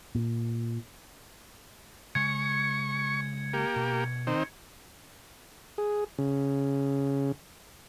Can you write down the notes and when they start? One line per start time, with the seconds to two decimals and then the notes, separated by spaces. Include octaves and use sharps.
0.15 A#2
2.15 C#3 G#3 C#6 G#6 C#7
3.53 A#3 G4
3.76 B2
4.27 D#3 C4
5.78 G#4
6.18 C#3